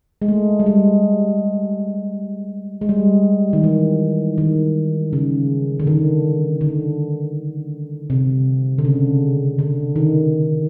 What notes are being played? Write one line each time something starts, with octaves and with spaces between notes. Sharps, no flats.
G#3
A3
G3
G#3
G#3
G3
D#3
E3
D#3
C#3
D3
D#3
D3
C3
D3
C#3
D3
D#3